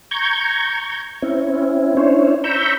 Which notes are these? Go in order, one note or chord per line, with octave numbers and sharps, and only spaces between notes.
A#5 C#6 G6 G#6
C4 C#4 E4
C#4 D4 E4 C5 C#5
A#5 B5 C#6 E6 G6